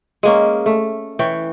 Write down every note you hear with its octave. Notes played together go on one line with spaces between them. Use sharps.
G#3 A#3 C#4
A3
E3 C#5 G5